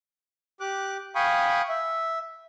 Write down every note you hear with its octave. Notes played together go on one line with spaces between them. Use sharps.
G4 D6 F#6
F5 G5 G#5 B5 C#6 D#6
E5